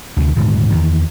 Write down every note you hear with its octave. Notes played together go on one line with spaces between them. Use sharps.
D2 C3 D#3
D#1 G#2 D3
E2 D#3